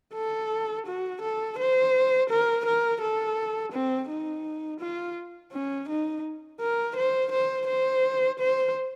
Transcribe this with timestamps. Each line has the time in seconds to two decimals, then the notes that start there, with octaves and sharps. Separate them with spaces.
0.14 A4
0.87 F#4
1.22 A4
1.59 C5
2.29 A#4
2.66 A#4
3.01 A4
3.72 C4
4.09 D#4
4.80 F4
5.52 C#4
5.89 D#4
6.60 A#4
6.96 C5
7.31 C5
7.67 C5
8.40 C5